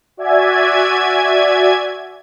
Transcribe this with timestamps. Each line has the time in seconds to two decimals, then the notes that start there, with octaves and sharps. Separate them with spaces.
0.17 F#4 D5 E5 G#5 G#6